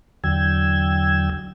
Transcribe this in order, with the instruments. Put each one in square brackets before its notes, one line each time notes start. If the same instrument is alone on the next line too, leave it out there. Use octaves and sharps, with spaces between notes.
[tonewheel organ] E2 D3 F#3 G5 E6 G#6